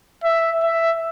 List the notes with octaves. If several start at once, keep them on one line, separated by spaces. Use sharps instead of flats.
E5
E5